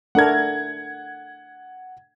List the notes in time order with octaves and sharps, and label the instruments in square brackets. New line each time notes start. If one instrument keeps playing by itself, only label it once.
[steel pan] A3 D4 A#4 [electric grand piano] F#5 G#6